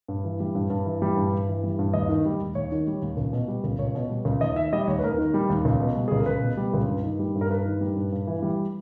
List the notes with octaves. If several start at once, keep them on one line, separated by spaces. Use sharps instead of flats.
G2
E3
G3
G2
G2
E3
G3
G2
G2
E3
G3
G2
D#2 D#5
D#3
G3
D#2
D#2 C#5
D#3
G3
D#2
C#2
B2
G3
C#2
C#2 C#5
B2
G3
C#2
D#2 D#5
D#3 E5
G3 D#5
D#2 C#5
B4
D#2 A#4
D#3
G3
D#2
C#2
B2
G3
C#2 G#4
A#4
C#2 B4
B2
G3
C#2
G2
D#3
G3
G2
A#4
G2 B4
D#3
G3
G2
G2
E3
G3